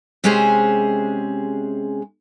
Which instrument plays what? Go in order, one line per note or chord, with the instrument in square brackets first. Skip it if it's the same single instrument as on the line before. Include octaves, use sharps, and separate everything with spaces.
[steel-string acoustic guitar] C3 G#3 C#4 G4 G#4 C5